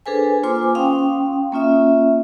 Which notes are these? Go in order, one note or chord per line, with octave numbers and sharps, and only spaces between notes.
D4 G#4 A4 B4 C5 G#5
A#3 F4 C5 G#5 C6 D6
C#4 F5 G5 C6 D#6
A#3 C#4 F4 E5